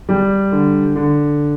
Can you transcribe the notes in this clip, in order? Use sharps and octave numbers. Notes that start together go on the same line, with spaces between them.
G3
D3
D3